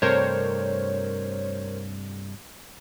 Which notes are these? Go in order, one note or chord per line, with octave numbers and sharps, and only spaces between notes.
G2 C3 A3 A#4 C5 C#5